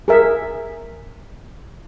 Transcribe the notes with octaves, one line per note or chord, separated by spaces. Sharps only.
G#4 A#4 E5